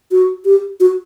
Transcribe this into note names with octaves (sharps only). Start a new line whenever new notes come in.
F#4
G4
F#4